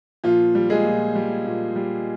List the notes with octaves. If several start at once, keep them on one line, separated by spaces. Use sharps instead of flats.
A#2 F3 F4
G3
G#3 G#4
A#2
G3
A#2
G3